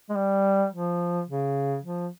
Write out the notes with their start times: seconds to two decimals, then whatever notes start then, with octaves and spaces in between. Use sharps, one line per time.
0.09 G#3
0.16 G3
0.72 F3
1.28 C#3
1.83 F3